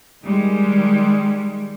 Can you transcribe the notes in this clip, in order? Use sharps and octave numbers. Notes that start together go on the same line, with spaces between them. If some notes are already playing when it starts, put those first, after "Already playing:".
D#3 G3 G#3